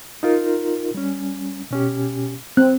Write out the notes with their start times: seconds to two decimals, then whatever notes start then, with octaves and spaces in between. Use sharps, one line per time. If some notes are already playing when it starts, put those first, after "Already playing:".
0.23 D#4 F4 A#4
0.94 G3 C#4
1.71 B2 C#4 G4
2.57 C4 F#6